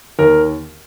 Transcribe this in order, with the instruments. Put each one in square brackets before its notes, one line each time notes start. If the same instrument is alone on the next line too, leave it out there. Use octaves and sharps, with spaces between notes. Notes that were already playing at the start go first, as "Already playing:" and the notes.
[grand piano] D#2 A#4